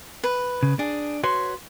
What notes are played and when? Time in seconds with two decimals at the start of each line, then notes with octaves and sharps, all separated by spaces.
0.24 B4
0.63 C#3
0.79 D4 G#4
1.24 F#4 B4 C#5 C6